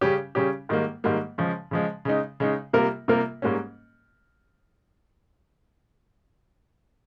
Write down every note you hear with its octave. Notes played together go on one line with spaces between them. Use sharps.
C#3 G3 C#4 G4
C#3 G3 C#4 G4
G#2 D#3 G3 A#3
G#2 D#3 G3 A#3
C#3 F3 G#3
C#3 F3 G#3
C#3 G#3 D#4
C#3 G#3 D#4
C3 G3 A#3 F4 A#4
C3 G3 A#3 F4 A#4
G#2 G3 A#3 C#4